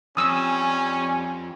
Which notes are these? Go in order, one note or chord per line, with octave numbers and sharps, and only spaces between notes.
F2 G3 C#4 G#5 D#6 E6